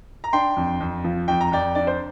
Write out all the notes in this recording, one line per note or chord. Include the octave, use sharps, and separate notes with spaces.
A#5
D4 G5 C6
F2
F2
F3
F2 G5
A#5
F2 D5 G5
D4 D5
C5